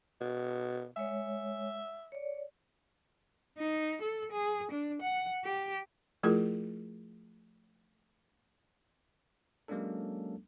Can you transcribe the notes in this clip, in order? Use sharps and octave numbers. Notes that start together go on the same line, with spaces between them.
B2
G#3 C#5 E5
C#5 D5
D#4
A4
G#4
D4
F#5
G4
F3 A3 E4 F4 G#4 A#4
F#3 G#3 A#3 C#4 D4 A4